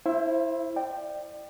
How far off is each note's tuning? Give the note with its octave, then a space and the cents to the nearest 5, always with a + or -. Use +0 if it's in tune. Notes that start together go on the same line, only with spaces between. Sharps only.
E4 +0 C5 +20 E5 +40
D5 +35 G5 +0